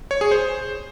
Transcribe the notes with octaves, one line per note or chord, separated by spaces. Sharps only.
C#5
G#4
C5